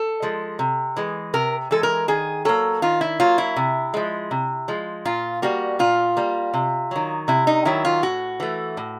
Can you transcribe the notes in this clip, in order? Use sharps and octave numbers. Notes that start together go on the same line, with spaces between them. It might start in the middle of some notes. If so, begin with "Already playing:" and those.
Already playing: A4
F3 G#3
C3
E3 G#3
C3 A#4
E3 G#3 A4
A#4
D#3 G#4
F#3 A#3 A4
D#3 F4
E4
F#3 A#3 F4
E4
C3
F3 G#3
C3
F3 G#3
A#2 F4
G3 A#3 F#4
A#2 F4
G3 A#3
C3
D#3 F#3
C3 E4
D#4
D#3 F#3 E4
F4
A2 F#4
E3 A3
A2